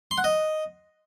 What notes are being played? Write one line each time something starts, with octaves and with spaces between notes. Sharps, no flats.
C6
F#5
D#5